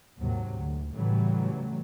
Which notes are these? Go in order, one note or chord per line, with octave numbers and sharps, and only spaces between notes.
D#2 G#2 C3 F#3
D2
A2 C#3 E3 F#3 G3 A3